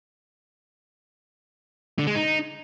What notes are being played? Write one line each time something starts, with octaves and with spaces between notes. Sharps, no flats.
D3
G#3
D#4